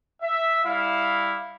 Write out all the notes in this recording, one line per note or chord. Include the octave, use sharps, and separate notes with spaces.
E5
G3 E4 F5